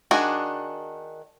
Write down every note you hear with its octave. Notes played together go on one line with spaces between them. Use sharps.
D#3 D4 F#4 G#4